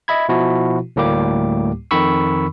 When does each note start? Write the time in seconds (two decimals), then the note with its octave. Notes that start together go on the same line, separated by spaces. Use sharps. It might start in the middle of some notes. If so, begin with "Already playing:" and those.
0.08 D#5 E5 B5 G#6
0.29 B2 F3 E4 F#4
0.96 D2 A2 G3 A#3 G4 D6
1.91 F2 D#3 B5 C#6 E6